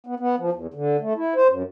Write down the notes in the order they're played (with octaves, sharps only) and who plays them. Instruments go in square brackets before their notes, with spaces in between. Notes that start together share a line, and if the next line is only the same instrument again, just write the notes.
[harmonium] B3
B3
F3
E2
D3
A3
E4
C5
F#2